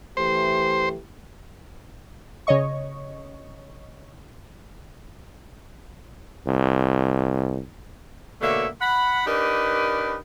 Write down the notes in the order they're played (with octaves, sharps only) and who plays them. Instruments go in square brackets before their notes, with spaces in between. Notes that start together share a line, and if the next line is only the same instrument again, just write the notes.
[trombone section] E3 A3 G4 [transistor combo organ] C5
[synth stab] C#3 C#5 D#5 C#6
[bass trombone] C2
[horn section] B2 D3 A3 A#3 C#5 E5
F#5 B5
D4 D#4 G4 A#4 B4